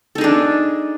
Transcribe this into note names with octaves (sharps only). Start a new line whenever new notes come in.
D4 D#4 G#4 A4